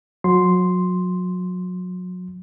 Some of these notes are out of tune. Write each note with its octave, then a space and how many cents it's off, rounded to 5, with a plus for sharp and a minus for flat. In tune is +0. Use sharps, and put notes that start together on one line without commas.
F#3 -30 C6 +0